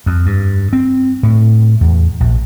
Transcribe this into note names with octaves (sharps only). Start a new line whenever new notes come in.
F2
G2
C4
A2
E2
A#1